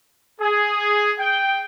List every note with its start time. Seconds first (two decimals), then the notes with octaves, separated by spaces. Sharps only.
0.41 G#4
1.19 G5